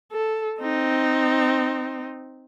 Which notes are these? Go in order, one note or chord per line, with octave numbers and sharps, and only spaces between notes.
A4
C4 D#4